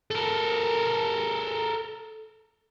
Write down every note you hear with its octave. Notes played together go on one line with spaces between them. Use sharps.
A4 A#4